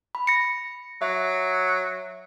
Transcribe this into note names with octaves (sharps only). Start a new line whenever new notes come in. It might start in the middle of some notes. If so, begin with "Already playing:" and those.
B5
A#6 C#7
F#3 E5